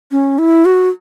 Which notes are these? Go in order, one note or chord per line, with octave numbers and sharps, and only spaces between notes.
C#4
E4
F#4